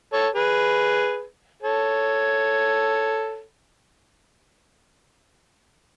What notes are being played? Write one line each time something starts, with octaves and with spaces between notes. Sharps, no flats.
A4 C#5
G#4 B4
A4 C#5